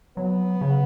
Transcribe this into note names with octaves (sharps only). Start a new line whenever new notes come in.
F#3 B3
C#3